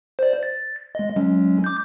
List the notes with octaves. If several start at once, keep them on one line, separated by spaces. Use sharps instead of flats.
C5 D5
A6
G#3 D#5
F#3 G#3 C#4
D6 G6